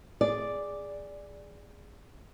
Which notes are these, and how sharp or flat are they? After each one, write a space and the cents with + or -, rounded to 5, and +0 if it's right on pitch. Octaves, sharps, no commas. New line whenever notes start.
G#4 -10 D5 +0